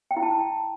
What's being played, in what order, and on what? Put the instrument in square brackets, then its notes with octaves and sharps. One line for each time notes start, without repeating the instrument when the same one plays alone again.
[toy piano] G5
E4
A5